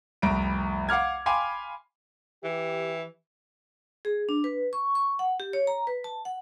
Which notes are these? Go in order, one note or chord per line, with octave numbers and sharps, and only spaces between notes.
F1 C2 A#5 B5 D7
F5 F#5 D6 F6 G#6
F5 G5 G#5 B5 C6 D6
E3 G4
G#4
D4
B4
C#6
C#6
F#5
G4
C#5
A#5
B4
A5
F#5